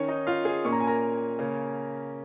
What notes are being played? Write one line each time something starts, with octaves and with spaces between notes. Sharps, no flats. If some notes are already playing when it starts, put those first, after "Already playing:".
Already playing: D#3 C#4 C#5
D#4 D#5
F4 F5
G#4 G#5
A#2 A#3 C#4 C#6
A#5
G#5
A#4 A#5
C#3 A#3 C#4